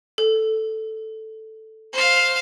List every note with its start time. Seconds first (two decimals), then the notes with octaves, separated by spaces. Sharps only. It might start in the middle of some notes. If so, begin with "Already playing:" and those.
0.18 A4
1.93 C5 F5